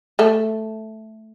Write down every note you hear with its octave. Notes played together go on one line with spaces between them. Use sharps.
A3 A4